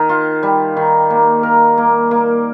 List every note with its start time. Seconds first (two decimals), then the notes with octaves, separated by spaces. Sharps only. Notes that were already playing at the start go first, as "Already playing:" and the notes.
Already playing: D#3
0.09 F4
0.43 G3
0.77 D#3
1.10 A#3
1.43 A#4
1.78 A#3
2.11 A#3